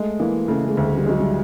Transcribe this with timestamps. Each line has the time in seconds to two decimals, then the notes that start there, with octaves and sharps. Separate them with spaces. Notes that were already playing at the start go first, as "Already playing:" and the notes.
Already playing: G#3 A3
0.20 E3 A#3
0.48 C#3 A3
0.67 G#3
0.77 D2
0.87 G#3
0.97 G3
1.06 F#3 G#3
1.20 G3